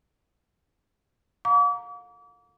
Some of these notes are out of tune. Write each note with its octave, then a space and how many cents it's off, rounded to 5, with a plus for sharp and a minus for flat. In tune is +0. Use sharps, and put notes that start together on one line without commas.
F5 +40 A#5 +0 D6 -35